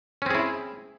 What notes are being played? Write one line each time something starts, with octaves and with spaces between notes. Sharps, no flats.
C4 C#4 E4 G#4